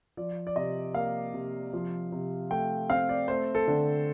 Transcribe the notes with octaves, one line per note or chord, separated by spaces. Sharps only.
F3 D5
D5
C3 D#5
A#3 F5
C3
F3
C3
A3 G5
C4 F5
D5
A3 C5
A4
D3